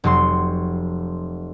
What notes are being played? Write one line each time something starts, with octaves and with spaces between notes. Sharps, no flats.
F1 F#3 C6